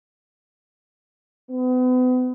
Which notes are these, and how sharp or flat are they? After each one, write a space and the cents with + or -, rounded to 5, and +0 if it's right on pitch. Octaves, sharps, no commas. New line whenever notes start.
B3 +40